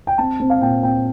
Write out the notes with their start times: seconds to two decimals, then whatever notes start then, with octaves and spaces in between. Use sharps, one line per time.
0.07 G5
0.18 C4 A5
0.40 C4
0.50 F5
0.61 A#2 G5
0.83 C4 G5